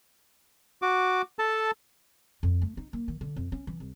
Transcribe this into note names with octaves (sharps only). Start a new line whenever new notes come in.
F#4 D6
A4 A5
F2
A3
D#4
A#3
D#3
D3
F2
C#4
E3
C2